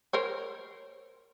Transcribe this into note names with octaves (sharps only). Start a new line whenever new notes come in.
A#4 C5 C#5